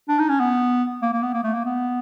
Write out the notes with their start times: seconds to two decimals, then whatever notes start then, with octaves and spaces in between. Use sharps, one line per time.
0.08 D4
0.19 D#4
0.29 C#4
0.40 B3
1.02 A#3
1.12 A#3
1.22 B3
1.34 A#3
1.44 A3
1.54 A#3
1.65 B3